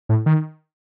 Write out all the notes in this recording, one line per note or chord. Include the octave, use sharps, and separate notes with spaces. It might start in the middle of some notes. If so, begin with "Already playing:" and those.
A2
D#3